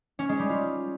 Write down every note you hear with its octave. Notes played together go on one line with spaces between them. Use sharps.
C#4
G#3
G3
F4